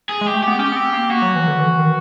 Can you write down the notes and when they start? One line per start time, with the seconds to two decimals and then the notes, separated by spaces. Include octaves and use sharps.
0.09 G#4
0.21 G#3
0.26 G4
0.34 A3
0.43 B3 G4
0.59 C#4 G4
0.72 B3
0.76 C4
0.93 A#3
1.10 A#3 F#4
1.22 F#3
1.36 E3
1.48 D3
1.60 E3
1.79 D#3